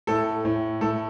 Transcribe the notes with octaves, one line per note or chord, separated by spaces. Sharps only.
A2 A4
A2
A2 A4